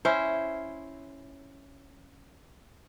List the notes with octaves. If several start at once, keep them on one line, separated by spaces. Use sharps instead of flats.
C#4 E4 C5